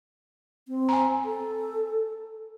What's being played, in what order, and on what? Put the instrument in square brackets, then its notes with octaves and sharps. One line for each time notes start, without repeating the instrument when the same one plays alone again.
[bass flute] C4
[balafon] G#5 A#5
[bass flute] A4